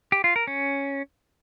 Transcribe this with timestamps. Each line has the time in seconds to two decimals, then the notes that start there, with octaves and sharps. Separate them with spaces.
0.12 G4
0.24 F4
0.36 A#4
0.47 C#4